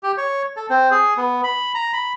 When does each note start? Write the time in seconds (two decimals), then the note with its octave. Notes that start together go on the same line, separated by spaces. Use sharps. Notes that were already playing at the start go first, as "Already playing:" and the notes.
0.03 G4
0.18 C#5
0.57 A4
0.70 C4
0.91 G#4
1.17 B3
1.44 B5
1.75 A#5
1.93 B5